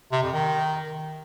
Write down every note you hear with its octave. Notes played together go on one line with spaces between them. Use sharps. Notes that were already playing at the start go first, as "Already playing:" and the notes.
C3
F2
D#3